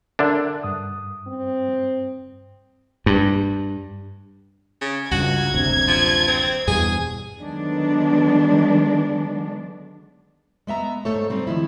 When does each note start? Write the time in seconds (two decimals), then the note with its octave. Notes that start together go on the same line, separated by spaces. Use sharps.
0.19 D3 D4 A#4 E5 F#6
0.64 G2 D#6
1.27 C4
3.06 G2
4.81 C#3
5.11 C#2 G2 F#4 G#6
5.54 F#1 D2 C3
5.88 F3
6.28 C4
6.67 E2 G2 B2 G#4
7.40 D3 D#3 F#3 G#3 B3 D4
10.67 G#3 B3 E5 A#5
11.05 G#2 A3 A4 C5 C#5
11.30 G3 C4 D#4
11.47 D#3 F3 E4